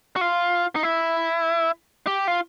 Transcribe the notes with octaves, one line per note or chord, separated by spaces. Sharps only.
F#4
F4
D#4
E4
G4
F4